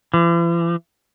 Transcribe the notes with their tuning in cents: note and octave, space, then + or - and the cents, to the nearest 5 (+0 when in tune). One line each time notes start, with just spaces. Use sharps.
E3 +45